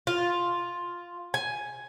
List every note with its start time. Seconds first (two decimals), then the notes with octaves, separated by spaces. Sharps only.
0.07 F4
1.34 G#5